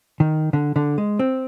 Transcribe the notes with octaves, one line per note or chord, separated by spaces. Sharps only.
D#3
D3
D3
G#3
C4